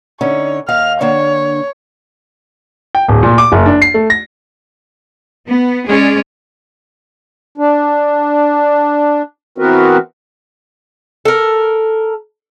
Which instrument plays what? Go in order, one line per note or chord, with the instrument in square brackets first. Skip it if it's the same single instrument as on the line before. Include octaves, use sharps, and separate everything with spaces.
[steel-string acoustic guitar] D3 C#4 D#4 [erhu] C#5
[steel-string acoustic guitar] D#2 D#5 F5 [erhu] F6
[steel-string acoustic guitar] D3 A#3 D4 [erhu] C#5
[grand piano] G5
D1
A#2
D6
F#1
D4
C7
A3
A#6
[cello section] B3
[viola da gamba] G#3 C#4 [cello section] G#4 D5
[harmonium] D4
E3 B3 C4 F#4 A#4 B4
[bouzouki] A4 A#4